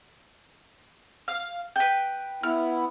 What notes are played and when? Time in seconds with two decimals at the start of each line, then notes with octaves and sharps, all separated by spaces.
1.28 F5 F6
1.76 B4 G5
2.43 B3 E4 F6